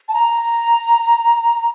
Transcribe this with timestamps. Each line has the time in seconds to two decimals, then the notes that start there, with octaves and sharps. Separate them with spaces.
0.09 A5
0.14 A#5